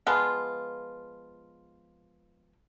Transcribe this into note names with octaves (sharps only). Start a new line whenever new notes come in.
F3 G#3 B3 F4